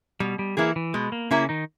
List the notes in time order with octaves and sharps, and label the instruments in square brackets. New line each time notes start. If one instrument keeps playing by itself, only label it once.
[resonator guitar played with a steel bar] B2 [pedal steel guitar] G3
[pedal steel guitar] G3
[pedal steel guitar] E3 [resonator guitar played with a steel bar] A#3 E4 G#4
[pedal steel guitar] E3
[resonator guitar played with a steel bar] B2 [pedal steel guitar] G#3
[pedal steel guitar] A#3
[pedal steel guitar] C#3 C#4 [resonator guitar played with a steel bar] A#3 E4 G#4
[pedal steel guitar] D#3 D#4